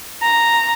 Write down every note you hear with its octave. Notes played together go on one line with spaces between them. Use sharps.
A#5